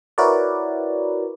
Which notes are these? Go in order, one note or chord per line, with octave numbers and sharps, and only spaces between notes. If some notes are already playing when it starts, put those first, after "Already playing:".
E4 F#4 A#4 B4 C#5 D5